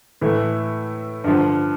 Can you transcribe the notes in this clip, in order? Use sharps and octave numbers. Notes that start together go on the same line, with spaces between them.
A2 E3 A3
G2 D3 F3